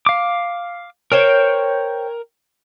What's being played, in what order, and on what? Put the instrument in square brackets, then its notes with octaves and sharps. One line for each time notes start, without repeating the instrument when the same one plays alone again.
[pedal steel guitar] F5 D6
[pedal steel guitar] A#4 [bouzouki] C5 C#5 G5